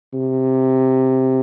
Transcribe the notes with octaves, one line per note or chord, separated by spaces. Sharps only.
C3